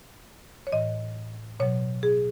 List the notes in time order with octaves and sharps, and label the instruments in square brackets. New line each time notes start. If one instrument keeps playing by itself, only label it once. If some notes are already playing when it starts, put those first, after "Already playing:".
[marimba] C#5
A2 E3 D#5
B2 F#3 C#5
G#4